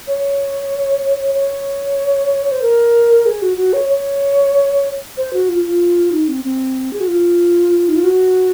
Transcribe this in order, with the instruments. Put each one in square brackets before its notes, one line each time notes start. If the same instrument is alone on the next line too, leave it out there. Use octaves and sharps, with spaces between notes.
[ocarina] C#5
C#5
C5
A#4
G#4
F#4
F#4
C#5
C#5
C5
F#4
F4
F4
D#4
C4
C4
G#4
F#4
F4
D#4
F4
F#4